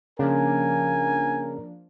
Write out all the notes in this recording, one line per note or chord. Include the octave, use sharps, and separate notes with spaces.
C#3 F3 A#3 D4 A#4 G#5